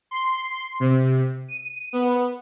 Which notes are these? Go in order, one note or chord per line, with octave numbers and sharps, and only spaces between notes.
C6
C3
D#7
B3